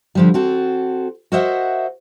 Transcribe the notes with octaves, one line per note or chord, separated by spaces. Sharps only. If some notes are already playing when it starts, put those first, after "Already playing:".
D3 F3 G3
C4 F#4 A4
F#4 A#4 C5 D#5 E5 F#5